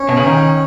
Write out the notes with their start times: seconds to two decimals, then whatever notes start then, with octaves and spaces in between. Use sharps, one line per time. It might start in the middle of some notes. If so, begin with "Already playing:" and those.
Already playing: C#4
0.09 B2
0.17 C#3
0.26 D#3